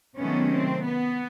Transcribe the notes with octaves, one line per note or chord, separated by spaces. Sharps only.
C3 D#3 F#3 A3 B3 C#4
C4
B3